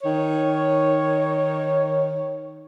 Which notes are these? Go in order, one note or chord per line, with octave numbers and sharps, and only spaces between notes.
D#3 C#5